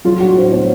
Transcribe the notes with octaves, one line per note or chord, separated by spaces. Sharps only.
F#3 F4
D4 F#4
A2 C5
C5
B3 C#5